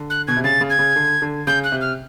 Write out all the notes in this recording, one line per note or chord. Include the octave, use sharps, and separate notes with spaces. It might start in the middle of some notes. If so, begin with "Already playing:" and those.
Already playing: D3
F#6
B2 G#6
C3
C#3 A6
C#3
G#6
C#3
D3
D3
C#3 G6
F#6
C3
F6